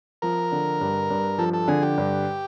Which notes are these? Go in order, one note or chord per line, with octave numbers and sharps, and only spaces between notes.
F3 A#4
D3
G2
G2
F3 A4
A4
D3 G#4
G4
G2